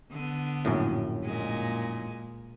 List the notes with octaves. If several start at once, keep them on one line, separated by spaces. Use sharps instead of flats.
D3 B3
A#1 F#2 A2
A#2 G#3